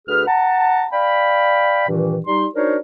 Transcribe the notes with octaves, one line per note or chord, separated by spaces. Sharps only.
D2 G#4 B4 F6
F#5 A5 A#5
D5 F5 G5 B5
G2 A#2 D#3 E3
G3 D#4 C6
D4 D#4 F#4 A#4 C5 C#5